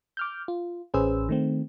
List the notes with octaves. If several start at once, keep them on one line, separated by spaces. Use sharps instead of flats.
D6 F6 G6
F4
A1 C#4 G#4 B4 C5 E6
D#3 A3 C4